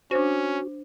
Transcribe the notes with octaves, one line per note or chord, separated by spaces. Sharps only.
C#4 D4 F#4 C5